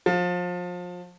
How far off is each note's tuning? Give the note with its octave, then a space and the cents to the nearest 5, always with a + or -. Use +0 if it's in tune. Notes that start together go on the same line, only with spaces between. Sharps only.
F3 +30